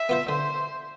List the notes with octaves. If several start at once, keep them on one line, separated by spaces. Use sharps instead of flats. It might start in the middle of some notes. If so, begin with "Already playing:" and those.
Already playing: E5
B3 F4 C5
D3 C5